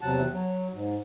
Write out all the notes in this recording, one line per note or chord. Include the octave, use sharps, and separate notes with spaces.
E2 C3 F#3 F#5 A5
F#3
G#2